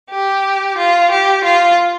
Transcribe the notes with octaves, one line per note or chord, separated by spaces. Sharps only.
G4
F4
G4
F4